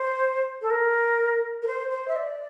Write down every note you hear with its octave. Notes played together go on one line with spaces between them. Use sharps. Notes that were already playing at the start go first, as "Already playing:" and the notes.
Already playing: C5
A4
A#4
A#4
C5
C5
E5
D5